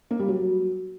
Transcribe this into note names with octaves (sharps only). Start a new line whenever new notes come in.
A#3
G3
F#3